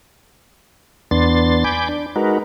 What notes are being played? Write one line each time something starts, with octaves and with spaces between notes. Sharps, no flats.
E2 B3 D4 C6 A6
G#5 B5 D6 G6
D4
G#3 D#4 F#4 A#4 B4